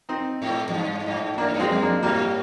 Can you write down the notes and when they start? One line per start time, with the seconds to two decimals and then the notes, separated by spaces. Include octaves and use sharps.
0.09 C4 D#4
0.42 G#2
0.69 F2
0.73 G2
0.99 G2
1.06 G#2
1.34 A#2 A#3 D4
1.44 G#2
1.54 G2
1.60 G#3 C4
1.71 F2
1.82 A#3 D4
2.03 G#2 G3 A#3